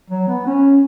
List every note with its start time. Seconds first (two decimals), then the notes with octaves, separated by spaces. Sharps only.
0.10 F#3
0.28 B3
0.46 C#4